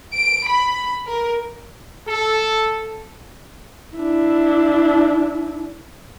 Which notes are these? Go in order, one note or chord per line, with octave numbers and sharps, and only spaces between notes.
D7
B5
A#4
A4
D4 E4